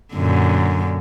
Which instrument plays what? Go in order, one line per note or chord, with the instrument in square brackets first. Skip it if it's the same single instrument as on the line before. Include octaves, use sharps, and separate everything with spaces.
[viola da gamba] F#2 A#2 D3